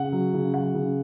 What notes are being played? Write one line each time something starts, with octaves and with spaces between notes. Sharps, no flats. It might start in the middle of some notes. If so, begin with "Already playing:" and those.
Already playing: C#3 F#5
F#3
C#3
F#3 F#5
C#3